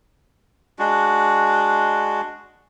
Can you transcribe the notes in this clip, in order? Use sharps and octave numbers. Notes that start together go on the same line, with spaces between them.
G#3 D4 F#4